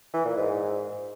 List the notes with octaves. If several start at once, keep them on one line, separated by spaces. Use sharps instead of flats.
E3
A#2
G#2